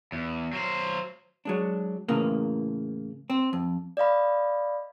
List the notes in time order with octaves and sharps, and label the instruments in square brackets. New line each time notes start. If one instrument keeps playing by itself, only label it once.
[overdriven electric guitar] E2
F#3 C5
[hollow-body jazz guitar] F#3 G#3 D4
A2 C#3 E3 A#3
C4
F2
[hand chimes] D5 D#5 F5 B5